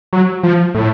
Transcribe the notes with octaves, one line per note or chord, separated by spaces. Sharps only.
F#3
F3
A2